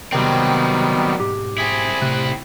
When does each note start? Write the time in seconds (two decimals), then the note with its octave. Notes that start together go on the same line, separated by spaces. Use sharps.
0.12 C3 D#3 F#3 G3 B3 C4 G5
1.19 B1 G#2 G4
1.58 C4 E4 G#4
2.01 A2 C3 F#6